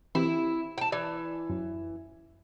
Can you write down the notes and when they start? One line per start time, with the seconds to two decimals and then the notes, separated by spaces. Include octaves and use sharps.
0.15 E3 C4 E4 G4
0.78 G5 A5
0.92 E3 D5
1.50 F#2